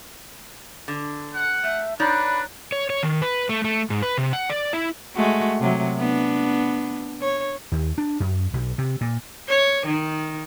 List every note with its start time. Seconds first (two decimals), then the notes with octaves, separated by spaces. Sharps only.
0.88 D3
1.35 F#5
1.64 A3 E5
2.00 D4 D#4 B4 C#5 D5 B5
2.72 C#5
2.90 C#5
3.03 D#3
3.22 B4
3.49 A3
3.64 A3
3.90 G#2
4.02 B4
4.18 C3
4.33 F#5
4.50 D5
4.73 E4
5.15 G#3 A3 F#4
5.60 C3 F#3
5.98 B3 D4
7.21 C#5
7.72 D#2
7.98 D4
8.20 F#2
8.53 B1
8.78 C3
9.01 A#2
9.48 C#5
9.87 D#3